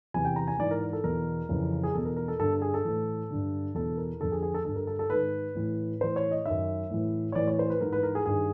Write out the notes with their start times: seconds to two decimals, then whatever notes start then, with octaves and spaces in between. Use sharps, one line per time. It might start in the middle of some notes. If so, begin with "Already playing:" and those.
0.14 E2 C3 E3 G#5
0.25 G5
0.36 A#5
0.48 G#5
0.59 G#2 E3 D5
0.71 A#4
0.93 A4
1.04 E2 B2 A#4
1.49 F2 C#3 E3
1.84 G#4
1.94 E2 B2 A4
2.05 A#4
2.17 A#4
2.28 A4
2.39 G2 D3 A4
2.62 G#4
2.74 A4
2.85 A2 E3
3.30 G2 D3
3.74 E2 B2 A4
3.97 A#4
4.20 F2 D3 A4
4.32 G#4
4.42 G#4
4.54 A4
4.65 G2 D3 A4
4.76 A#4
4.87 A4
4.99 A4
5.10 G#2 D#3 B4
5.55 A2 E3
6.00 A2 E3 C5
6.16 C#5
6.31 D#5
6.45 F#2 D#3 E5
6.90 A2 E3
7.32 C#5
7.35 A2 E3 D5
7.47 C#5
7.59 C5
7.70 B4
7.81 G#2 E3 A#4
7.93 B4
8.03 A#4
8.15 G#4
8.26 G2 D#3 G#4